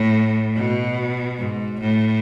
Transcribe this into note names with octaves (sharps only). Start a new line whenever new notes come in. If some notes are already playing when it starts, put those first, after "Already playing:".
Already playing: A2
B2
G#2
A2